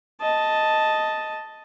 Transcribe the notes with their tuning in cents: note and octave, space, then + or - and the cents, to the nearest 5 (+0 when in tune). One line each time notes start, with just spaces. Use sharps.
D#5 +5 A5 +0